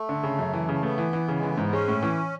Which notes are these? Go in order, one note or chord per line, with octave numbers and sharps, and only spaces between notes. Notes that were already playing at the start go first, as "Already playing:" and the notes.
Already playing: A3
D3
C#3
F#2
E3
C#3 A3
A3 B3
E3
E3
C#3
E3 G#3
A3
G#2 B3
G#3 C#4
A2
E3